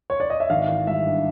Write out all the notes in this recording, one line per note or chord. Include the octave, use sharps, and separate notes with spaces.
C#5
D5
D#5
E5
G#1 F5
E3
G3 E5
G2